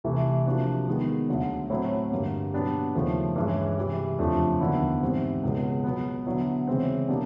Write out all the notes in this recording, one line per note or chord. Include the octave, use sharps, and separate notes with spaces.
C2 C3 E3 A3
C3 F3 A#3 D4 F#4
D#3 G#3 B3
D2 D3 F#3
A2 F#3 A3 C4 E4
G2 D3 G3 A#3
B2 F#3 B3 D4 G4
D#2 C#3 F3 A3
G2 E3 G#3 C#4
C3 E3 G3
F2 C#3 F3 A3 D4
D#2 D3 F#3 B3 E4
G#2 E3 G3 C4
C#2 B2 G#3 C#4
B2 F#3 B3
D3 F#3 B3 E4
C#3 E3 G#3 C4
B2 G3 A#3 D4